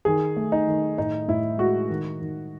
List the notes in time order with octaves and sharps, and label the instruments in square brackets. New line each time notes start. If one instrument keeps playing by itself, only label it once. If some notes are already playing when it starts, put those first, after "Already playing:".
[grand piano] D#3 G#4
A3
D#4
D#3
A2 D#4
A2 E4
G#3 F#4
D#3
D#3